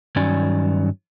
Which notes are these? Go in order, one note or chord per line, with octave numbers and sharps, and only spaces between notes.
G2 D#3 F#3 C#4 D5 G#5